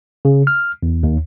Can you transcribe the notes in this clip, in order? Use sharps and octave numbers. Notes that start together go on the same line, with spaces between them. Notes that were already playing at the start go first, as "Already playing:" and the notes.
C#3
F6
E2
D#2